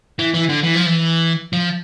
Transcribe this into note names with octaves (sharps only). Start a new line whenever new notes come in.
E3
E3
D3
E3
F3
E3
F3